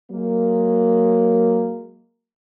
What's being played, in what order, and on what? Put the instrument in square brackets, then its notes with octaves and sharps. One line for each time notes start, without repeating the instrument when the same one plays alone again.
[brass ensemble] F#3 G#3 A#3